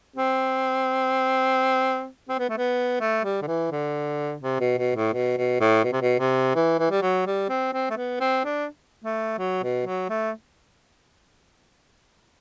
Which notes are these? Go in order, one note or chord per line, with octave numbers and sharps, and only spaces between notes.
C4
C4
B3
A3
B3
A3
G3
D3
E3
D3
C3
B2
B2
A2
B2
B2
A2
B2
C3
B2
C3
E3
E3
G3
F#3
G3
C4
C4
A3
B3
C4
D4
A3
F#3
B2
F#3
A3